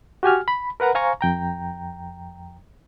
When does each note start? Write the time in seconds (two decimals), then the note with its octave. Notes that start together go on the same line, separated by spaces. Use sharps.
0.23 F#4 G4 G#5 F6
0.48 B5
0.80 A#4 B4 F#5 A#5
0.95 C5 F5 G#5 A#5 C#6
1.21 F2 G5 A#5